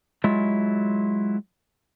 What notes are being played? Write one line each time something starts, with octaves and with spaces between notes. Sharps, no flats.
F#3 G#3 E4 F4